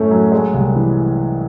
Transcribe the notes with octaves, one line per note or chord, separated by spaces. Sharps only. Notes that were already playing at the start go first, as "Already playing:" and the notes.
Already playing: F#2 A2 A3 C#4
F#3
G#3
C2
E3